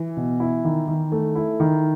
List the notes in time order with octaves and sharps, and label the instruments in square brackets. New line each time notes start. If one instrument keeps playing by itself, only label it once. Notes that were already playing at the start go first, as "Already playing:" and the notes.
Already playing: [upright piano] E3
[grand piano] B2
E4
D#3
D#3
A3
E4
D#3